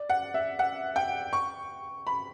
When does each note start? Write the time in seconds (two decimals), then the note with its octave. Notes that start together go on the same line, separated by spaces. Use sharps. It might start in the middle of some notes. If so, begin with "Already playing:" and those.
Already playing: D5
0.09 F#5
0.34 E5
0.59 F#5
0.96 G5
1.33 C#6
2.07 B5